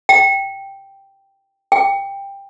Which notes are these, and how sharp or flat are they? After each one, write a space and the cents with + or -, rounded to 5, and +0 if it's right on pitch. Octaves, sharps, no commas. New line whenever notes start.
G5 +0
G5 +15